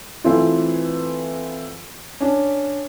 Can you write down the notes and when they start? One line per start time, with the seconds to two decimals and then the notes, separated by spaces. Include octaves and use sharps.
0.24 E3 A3 C4 E4 F4
2.20 C#4 D4